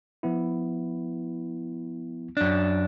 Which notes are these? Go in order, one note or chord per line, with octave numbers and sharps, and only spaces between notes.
F3 B3 E4
F#2 D4